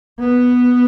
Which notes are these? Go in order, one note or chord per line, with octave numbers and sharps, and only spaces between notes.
B3